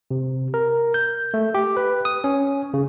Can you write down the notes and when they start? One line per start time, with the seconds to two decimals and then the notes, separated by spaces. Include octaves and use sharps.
0.11 C3
0.54 A#4
0.94 G6
1.34 A3
1.54 G4
1.77 B4
2.05 D#6
2.24 C#4
2.74 C#3